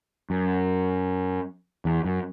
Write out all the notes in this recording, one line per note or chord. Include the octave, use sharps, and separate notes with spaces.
F#2
E2
F#2